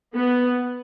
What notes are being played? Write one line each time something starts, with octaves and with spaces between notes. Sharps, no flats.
B3